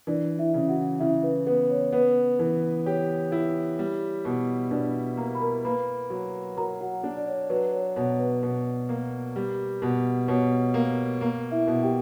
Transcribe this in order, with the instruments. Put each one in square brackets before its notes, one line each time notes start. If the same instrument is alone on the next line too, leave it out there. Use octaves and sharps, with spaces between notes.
[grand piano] E3 [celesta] D4 D5
[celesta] E4 E5
[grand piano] C#3
[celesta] F#4 F#5
[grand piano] C#3 [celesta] E4 E5
[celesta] B4
[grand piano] B3 [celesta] B4
[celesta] C#5
[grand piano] B3 [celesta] B4
[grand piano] E3
[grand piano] G4 [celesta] C#5
[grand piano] E4
G3
B2
[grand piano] B2 [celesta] D4 D5
[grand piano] A#3 [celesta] A#4 A#5
[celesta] B5
A#4 A#5
[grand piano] A#3 [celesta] B4 B5
[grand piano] F#3
[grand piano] F#3 [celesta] A#4 A#5
[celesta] F#4 F#5
[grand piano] D4
[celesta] D5
C#5
[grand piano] F#3 [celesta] B4
[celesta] C#5
[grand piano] B2 [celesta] C#5
[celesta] B4
[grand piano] B2
A#3
G3
B2
[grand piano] B2 [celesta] C#5
[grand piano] A#3
A#3
[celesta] E4 E5
[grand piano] B2
[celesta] G4 G5